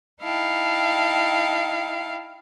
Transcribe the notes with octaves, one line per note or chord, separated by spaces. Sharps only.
D#4 E4 F5 G5 A5